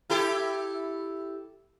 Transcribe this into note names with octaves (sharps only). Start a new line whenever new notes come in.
E4 G4 A4